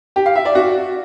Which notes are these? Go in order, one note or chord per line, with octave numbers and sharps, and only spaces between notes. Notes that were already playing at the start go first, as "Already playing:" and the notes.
G4
F5
E5
D5
F#4